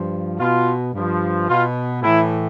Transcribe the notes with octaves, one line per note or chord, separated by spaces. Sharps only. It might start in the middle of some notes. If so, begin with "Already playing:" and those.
Already playing: G2 F3
B2 F4
G2 F3
B2 F4
A2 E3 E4